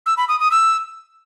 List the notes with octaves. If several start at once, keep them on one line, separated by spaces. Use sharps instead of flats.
E6
B5
D#6
D#6
E6